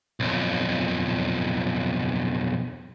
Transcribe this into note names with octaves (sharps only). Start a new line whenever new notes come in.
B1 F2